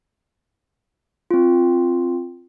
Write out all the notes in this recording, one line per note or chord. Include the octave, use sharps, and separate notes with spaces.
C4 F4